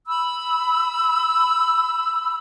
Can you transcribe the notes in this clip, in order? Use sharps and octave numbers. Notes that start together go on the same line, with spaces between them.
B5 E6